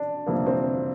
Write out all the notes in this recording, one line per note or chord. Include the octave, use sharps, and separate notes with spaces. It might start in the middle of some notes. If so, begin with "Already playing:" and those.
Already playing: D4
G1 F2 C3 F3 A#3
C4